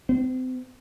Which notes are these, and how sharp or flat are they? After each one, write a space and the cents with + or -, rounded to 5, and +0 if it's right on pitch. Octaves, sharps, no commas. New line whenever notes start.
C4 -35